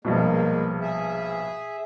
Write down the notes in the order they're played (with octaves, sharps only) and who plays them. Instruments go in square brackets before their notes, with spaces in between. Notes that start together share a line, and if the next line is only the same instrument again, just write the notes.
[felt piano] A#1 G2 B2 [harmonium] G#3 A#3
[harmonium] G#4 E5